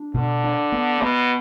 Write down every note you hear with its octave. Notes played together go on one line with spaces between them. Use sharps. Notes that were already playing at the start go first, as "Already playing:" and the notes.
Already playing: D4
B2 D3
D4
B3
B2 B3